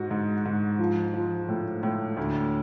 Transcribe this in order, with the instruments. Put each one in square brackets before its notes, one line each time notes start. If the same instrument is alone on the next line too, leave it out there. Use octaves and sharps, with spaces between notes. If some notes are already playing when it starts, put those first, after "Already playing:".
Already playing: [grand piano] G#2 F#4
G#2
G#2
F3
F3
A2
A2
D2